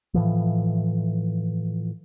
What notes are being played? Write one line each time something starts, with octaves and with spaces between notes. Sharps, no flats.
A2 E3 F3